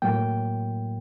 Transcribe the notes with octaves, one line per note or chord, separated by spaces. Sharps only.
A2 F#3 A#3 G5